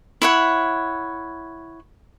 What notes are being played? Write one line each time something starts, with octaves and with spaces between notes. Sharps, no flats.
E4 C#5 F#5